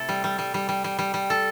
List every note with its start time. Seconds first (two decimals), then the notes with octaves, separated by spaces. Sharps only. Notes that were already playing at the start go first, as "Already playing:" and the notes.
Already playing: C3 A3 E4 A4
0.09 G3
0.24 G3
0.38 G3
0.54 G3
0.69 G3
0.84 G3
0.99 G3
1.14 G3
1.30 A4